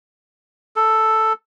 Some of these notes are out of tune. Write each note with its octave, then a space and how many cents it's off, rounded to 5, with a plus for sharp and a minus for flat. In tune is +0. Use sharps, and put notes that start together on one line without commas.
A4 +0